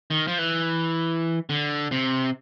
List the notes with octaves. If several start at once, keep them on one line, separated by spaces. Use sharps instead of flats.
D#3
F3
E3
D3
C3